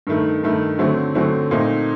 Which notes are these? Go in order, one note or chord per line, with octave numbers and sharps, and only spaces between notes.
G2 D#3 A3
G2 D#3 A3
D3 F#3 A3 C4
D3 F#3 A3 C4
A#2 A3 C4 D#4